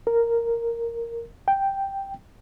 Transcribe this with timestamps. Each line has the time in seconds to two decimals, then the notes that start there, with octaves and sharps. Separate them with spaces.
0.07 A#4
1.48 G5